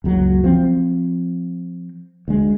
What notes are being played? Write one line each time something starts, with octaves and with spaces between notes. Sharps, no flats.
F#1 C#2 F#3
F3 C4
D2 G#3